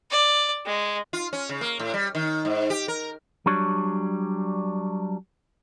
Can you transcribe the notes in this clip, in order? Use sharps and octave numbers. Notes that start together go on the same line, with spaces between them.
D5
G#3
F4
C#4
C#3
A#3
A2
G3
D#3
G#2
G4
A#4
F#3 G3 D4 C#5